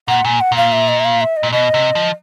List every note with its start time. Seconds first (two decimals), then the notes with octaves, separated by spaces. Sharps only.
0.08 A#2 F#5
0.25 A#2 G#5
0.41 F#5
0.52 A#2 F5
0.72 E5
0.88 D#5
1.00 E5
1.05 F5
1.21 E5
1.37 D#5
1.43 A#2
1.52 B2 D#5
1.74 C3
1.95 F3